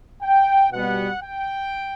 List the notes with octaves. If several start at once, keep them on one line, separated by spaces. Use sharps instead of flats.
G5
B2 G3 B3 F#5
G5